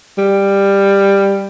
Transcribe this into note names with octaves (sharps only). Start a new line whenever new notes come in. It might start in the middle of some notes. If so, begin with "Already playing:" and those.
G3